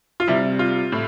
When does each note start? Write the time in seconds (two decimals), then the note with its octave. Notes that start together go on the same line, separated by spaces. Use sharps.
0.20 F4
0.28 C3 G3 E4
0.59 F4
0.92 A2